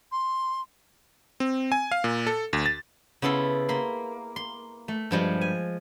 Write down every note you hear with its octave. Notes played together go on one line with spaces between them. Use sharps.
C6
C4
G#5
F5
A#2
A4
D2
A6
C#3 B3 E4 A4 C6
A#3 B5 C6
C6
A3
G2 F3 G3 G#3
G#5